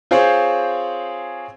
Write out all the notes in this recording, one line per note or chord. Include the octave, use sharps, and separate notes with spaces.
C4 F4 G#4 C5 C#5